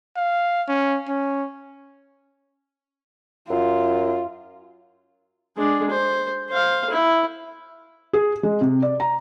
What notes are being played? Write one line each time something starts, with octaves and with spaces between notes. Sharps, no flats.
F5
C#4
C#4
F#2 F4
G#3 D4
C5
C5 F5
E4
G#4
G#3
C3
D5
A#5